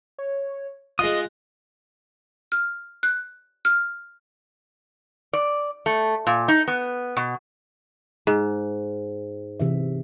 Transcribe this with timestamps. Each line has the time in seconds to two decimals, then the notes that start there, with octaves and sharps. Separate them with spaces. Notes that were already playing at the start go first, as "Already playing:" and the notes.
0.18 C#5
0.99 G#3 F4 D#5 D#6 F#6
2.52 F6
3.03 F#6
3.65 F6
5.33 D5
5.86 A3
6.27 A#2
6.48 D#4
6.68 B3
7.17 B2
8.27 G#2
9.60 C3 E3 E5